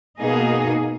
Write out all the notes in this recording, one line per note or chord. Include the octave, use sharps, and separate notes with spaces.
B2 A#3 D#4 G#4